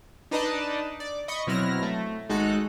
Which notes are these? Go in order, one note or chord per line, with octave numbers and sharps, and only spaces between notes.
D4 D#4 B4 D5 D#5 A5
D5
D#5 B5 C#6 D#6
B2 F#3 C4 E4 F6 A#6
A3
G#1 G#3 D#4 F#4 A4 F#6